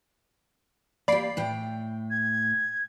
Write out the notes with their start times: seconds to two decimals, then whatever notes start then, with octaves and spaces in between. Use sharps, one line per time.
1.08 A#3 G4 D5 B5 C7
1.37 A2 G5
2.10 G#6